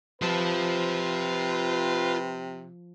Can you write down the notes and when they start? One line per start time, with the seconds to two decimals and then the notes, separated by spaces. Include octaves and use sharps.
0.22 C3 F3 F4 B4 A5